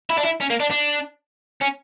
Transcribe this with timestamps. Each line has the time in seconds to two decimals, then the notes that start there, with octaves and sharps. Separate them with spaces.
0.10 E4
0.17 D4
0.24 E4
0.40 C#4
0.50 A#3
0.60 D4
0.71 D4
1.62 C#4